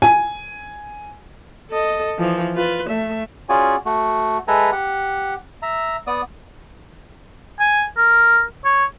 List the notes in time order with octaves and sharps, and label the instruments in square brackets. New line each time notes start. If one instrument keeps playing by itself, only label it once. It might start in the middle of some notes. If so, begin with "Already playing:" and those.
[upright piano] G#5
[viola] A4 D#5
E3 F3
F4 B4
A3 E5
[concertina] C#4 F4 F#4 G#4 D5 G#5
A3 F#4
G#3 A4 B4 E5 G#5 A#5
G4 F#5
E5 A#5
B3 D5 D#6
[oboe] G#5
A#4
C#5